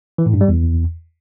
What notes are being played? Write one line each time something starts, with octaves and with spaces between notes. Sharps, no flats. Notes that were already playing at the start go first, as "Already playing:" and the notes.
E3
A2
G2
G3
E2